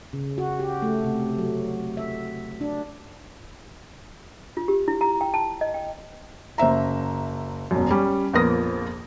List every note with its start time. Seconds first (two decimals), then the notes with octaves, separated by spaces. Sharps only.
0.13 C#3
0.38 F#4
0.60 G4
0.82 A3
1.04 C3
1.38 F#3
1.97 E5
2.61 D4
4.57 F4
4.68 G4
4.88 E4
5.01 A#5
5.21 G5
5.34 A5
5.61 D#5
5.74 G5
6.58 F#1 C5 E5 A#5
7.71 E1 F#2
7.91 G3 C#4
8.33 A#1 F2 B3 A#4 D#6 A#6